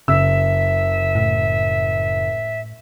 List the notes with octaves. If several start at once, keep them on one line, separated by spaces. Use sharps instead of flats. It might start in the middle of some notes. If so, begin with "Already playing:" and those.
F#1 C#3 E5 E6
A2